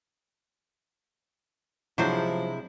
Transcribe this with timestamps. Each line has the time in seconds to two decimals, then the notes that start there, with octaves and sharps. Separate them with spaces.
1.98 B1 C3 F3 F#3 G#3 D4 E4 C5